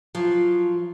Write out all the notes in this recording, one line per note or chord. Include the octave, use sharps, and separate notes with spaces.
F3 F#3